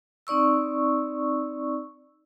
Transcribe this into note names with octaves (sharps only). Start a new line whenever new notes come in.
C4 D#4 D5 C#6 E6